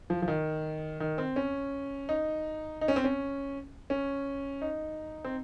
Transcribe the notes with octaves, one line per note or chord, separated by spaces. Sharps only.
F3
F3
D#3
D#3
C4
C#4
D#4
D#4
C#4
C4
C#4
C#4
D#4
C4